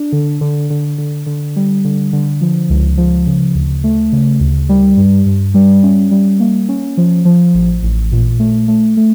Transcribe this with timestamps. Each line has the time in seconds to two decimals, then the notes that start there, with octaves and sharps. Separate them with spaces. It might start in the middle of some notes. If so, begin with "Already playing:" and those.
Already playing: D4
0.12 D3
0.41 D3
0.70 D3
0.98 D3
1.26 D3
1.56 G3
1.84 D3
2.13 D3
2.41 F3
2.70 C#2
2.98 F3
3.27 C#3
3.55 D2
3.84 A3
4.12 C#3
4.40 D2
4.69 G3
4.97 G2
5.26 G2
5.54 G3
5.83 C#4
6.11 G3
6.40 A#3
6.69 C#4
6.97 F3
7.25 F3
7.54 A1
7.83 A1
8.12 A#2
8.39 A3
8.68 A3
8.97 A3